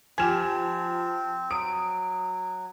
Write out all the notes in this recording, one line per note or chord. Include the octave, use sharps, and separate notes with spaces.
F3 C4 G4 G#5 F6 G#6 E7
F#3 D#6 D7